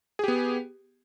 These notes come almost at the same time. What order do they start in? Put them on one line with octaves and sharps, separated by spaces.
G#4 G4 B3